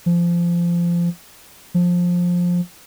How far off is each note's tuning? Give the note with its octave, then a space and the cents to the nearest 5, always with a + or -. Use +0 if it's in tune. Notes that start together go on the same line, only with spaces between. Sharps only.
F3 -20
F3 +15